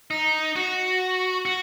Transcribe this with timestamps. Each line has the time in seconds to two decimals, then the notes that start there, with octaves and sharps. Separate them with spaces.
0.11 D#4
0.56 F#4
1.45 F#4